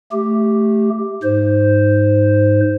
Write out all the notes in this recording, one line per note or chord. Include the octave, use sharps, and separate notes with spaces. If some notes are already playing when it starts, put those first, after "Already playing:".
A3 G4
G#2 C5